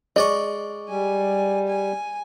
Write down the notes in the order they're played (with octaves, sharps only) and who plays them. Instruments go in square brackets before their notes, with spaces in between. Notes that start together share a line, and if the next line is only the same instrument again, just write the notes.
[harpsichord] G#3 D5 C#6 [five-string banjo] D#5
[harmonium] G3 [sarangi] G#5
[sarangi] G#5